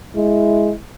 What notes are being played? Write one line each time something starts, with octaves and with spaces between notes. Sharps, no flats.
G#3 E4